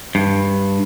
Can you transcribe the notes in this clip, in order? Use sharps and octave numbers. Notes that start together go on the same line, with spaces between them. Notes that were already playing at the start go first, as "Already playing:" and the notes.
G2